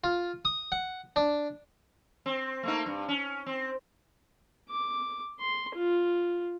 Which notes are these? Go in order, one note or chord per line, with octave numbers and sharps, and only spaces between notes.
F4
D#6
F#5
D4
C4
A3 A#3 D#4
G2
C#4
C4
D6
C6
F4